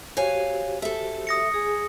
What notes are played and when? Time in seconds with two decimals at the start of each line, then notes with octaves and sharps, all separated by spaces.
0.17 F#4 G4 C5 C#5 F5 G#5
0.82 A4 E5
1.27 D#6 A#6 C#7
1.54 G#4 G#5